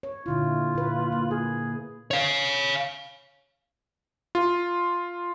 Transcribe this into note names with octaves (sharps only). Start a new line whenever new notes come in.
C#5
A#2 D3 E4 F4
A#2 B4
A#3
A#3 G#4
C#5 F5
F4